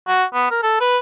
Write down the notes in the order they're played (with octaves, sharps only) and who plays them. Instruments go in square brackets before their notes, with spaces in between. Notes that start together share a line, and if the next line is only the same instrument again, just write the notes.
[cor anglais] F#4
B3
A#4
A4
B4